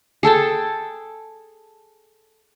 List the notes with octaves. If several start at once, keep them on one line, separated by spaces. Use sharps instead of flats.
G#4 A4 G5 A5